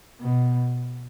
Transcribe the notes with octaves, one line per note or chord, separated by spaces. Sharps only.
B2